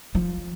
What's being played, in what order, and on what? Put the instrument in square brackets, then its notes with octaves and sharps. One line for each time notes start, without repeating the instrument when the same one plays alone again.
[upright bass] F3